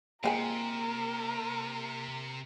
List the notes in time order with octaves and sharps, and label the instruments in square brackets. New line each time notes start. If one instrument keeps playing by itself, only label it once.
[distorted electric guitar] C3 [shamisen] F3 G#3 G#5 [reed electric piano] A#3 G5 [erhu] A#4